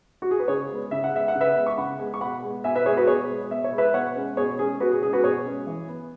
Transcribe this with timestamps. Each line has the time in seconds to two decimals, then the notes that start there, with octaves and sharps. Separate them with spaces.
0.22 F#4
0.31 G#4
0.40 B4
0.48 C#3 G#4 C#5
0.70 G#3 B3
0.91 C#3 E5
1.04 F#5
1.13 G#3 B3 E5
1.28 F#5
1.35 C#3
1.41 B4 E5
1.56 G#3 B3
1.66 C#6
1.78 C#3 F#5 B5
1.99 G#3 B3
2.14 C#6
2.21 B2 F#5 B5
2.43 G#3 B3
2.64 B2 E5 G#5
2.75 B4 E5
2.86 G#3 B3 G#4 C#5
2.96 F#4 B4
3.07 B2 G#4 C#5
3.29 G#3 B3
3.51 B2 E5
3.64 C#5
3.72 G#3 B3
3.78 B4 E5
3.94 B2 C#5 F#5
4.16 G#3 C#4
4.37 B2 G#4 C#5
4.59 G#3 C#4 G#4
4.80 B2 F#4 B4
4.91 G#4
5.02 G#3 C#4 G#4
5.13 F#4 B4
5.24 B2 G#4 C#5
5.45 G#3 C#4
5.67 E3
5.88 B3